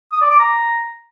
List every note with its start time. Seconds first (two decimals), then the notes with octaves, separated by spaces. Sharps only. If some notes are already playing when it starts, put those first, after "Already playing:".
0.12 D#6
0.21 D5
0.31 D6
0.40 A#5